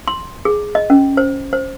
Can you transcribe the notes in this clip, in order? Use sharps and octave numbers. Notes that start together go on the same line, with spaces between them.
C6
G#4
D#5
C#4
C5
C5